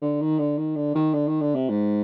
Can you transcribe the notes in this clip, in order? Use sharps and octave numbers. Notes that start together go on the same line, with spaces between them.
D3
D#3
D3
D#3
D3
D#3
D3
D#3
D3
C3
G#2